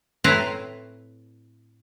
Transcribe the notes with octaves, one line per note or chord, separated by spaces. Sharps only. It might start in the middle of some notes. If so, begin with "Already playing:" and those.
A2 C4 E4 B4 C5 A#5